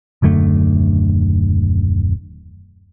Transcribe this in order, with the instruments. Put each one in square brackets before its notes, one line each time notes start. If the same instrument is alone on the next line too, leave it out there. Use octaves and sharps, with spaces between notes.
[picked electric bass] D#1 F#2 D3 A3